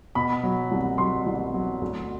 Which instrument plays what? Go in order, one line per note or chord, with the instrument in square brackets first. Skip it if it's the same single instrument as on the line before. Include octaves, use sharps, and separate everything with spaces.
[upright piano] B2 B5
F#3
C2
F#3 C6
C2
F#3
D2